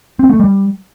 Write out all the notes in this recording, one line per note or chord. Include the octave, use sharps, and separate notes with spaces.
C4
A3
G3